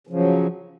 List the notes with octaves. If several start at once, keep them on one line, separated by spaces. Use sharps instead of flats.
C#3 F3 F#3